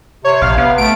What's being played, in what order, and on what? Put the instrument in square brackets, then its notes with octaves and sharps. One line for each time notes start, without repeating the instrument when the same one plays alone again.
[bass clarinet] C3 [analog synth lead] C#5
[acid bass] A#1 [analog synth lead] F5
[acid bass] B3
[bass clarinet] A3 [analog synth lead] D7